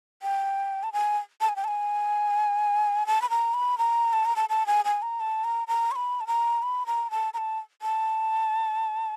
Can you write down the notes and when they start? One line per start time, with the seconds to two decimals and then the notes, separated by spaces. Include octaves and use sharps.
0.22 G5
0.83 A5
0.93 G#5
1.41 A5
1.49 G#5
1.56 G5
1.64 A5
1.68 G#5
3.07 A5
3.22 B5
3.30 A#5
3.54 B5
3.78 A#5
4.13 A5
4.25 A#5
4.36 A5
4.49 A5
4.67 G#5
4.85 G#5
5.02 A#5
5.20 A5
5.44 A#5
5.68 A#5
5.91 C#6
5.96 B5
6.21 A5
6.27 A#5
6.62 B5
6.86 A#5
7.11 A5
7.34 A#5
7.38 A5
7.82 A5